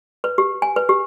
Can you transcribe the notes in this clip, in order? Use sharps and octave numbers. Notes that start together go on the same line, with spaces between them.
B4
G4
G#5
B4
G4